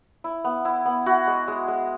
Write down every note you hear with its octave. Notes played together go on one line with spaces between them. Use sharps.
E4
B3
E4
B3
E4 F#4
G#3
G#3
G#3